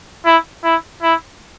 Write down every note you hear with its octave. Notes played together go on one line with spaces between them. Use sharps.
E4
E4
E4